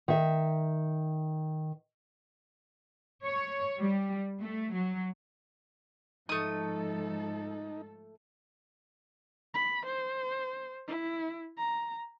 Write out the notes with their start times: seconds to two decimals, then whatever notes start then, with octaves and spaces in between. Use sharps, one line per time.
0.08 D#3 E5
3.25 C#5
3.79 G3
4.41 A3
4.74 F#3
6.29 G#2 F3 A3 D#4 A4 D#6
9.54 B5
9.86 C5
10.87 E4
11.57 A#5